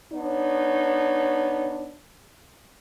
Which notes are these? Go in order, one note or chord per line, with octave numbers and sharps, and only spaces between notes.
B3 D4 D#4 C#5